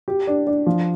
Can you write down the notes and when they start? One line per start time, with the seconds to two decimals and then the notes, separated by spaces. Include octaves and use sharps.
0.08 G4
0.27 D4
0.47 D4
0.66 F3